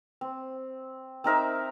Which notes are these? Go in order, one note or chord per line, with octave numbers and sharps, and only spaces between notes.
C4
C4 D#4 A#4 E5